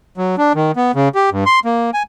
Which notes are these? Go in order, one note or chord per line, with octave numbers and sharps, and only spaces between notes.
F#3
D4
D#3
B3
C#3
G4
G2
C6
A#3
G#5